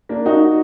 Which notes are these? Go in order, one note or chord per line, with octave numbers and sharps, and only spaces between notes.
A#3 D4
D#4 F#4